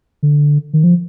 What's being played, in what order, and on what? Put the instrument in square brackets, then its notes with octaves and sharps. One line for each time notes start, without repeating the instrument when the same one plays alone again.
[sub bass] D3
D#3
F3